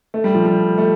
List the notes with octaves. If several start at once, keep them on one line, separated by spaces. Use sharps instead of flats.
A3
G3
F3
G3
A3